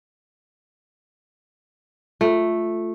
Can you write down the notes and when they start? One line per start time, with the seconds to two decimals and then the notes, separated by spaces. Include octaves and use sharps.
2.21 A3 F4